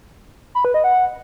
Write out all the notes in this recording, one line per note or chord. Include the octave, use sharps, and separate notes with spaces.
B5
B4
D#5
F#5